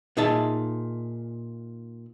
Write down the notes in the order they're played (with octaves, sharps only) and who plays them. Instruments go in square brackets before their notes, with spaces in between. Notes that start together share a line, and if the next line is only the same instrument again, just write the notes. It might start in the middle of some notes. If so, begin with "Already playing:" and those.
[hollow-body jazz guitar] A#2 D#4 G#4 E5 A5